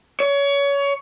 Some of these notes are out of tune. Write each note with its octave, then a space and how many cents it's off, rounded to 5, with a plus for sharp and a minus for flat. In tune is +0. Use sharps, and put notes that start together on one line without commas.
C#5 +25